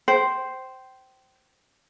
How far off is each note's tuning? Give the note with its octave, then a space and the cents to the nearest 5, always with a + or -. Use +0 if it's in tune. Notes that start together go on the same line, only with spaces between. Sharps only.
C5 +0 G5 -25